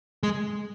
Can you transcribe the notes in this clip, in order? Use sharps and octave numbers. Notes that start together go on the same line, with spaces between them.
G#3